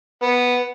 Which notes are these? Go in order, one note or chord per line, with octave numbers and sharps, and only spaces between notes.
B3